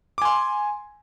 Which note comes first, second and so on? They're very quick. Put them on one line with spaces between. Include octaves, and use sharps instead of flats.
D6 G#5 C6